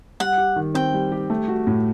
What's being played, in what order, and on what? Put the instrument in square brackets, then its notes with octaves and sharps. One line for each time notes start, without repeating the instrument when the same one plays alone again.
[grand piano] G3 [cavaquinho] F#5
[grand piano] G4
D#3
[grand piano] C4 [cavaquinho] G5
[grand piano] G3
G4
A3
F#4
A2